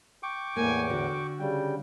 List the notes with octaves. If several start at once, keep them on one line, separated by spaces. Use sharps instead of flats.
G5 C#6 D6
E2 A2 A#3 G#5
D3 F#4
C#3 G3 G5